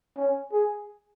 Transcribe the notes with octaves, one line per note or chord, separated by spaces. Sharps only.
C#4
G#4